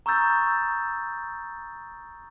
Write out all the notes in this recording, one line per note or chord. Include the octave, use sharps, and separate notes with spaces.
A#5 C#6 D#6 E6 G6 A6